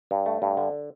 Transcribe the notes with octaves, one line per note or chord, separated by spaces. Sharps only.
G2
A3
G2
D3